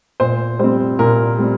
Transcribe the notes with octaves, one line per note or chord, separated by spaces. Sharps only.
A#2 C5
G3 C4 C5
A#2 A#4
G3 C4